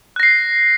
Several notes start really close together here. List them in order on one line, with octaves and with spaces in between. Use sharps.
F#6 A#6 C7